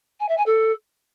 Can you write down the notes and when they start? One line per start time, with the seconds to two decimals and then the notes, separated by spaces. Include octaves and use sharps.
0.20 G#5
0.28 E5
0.37 G#5
0.46 A4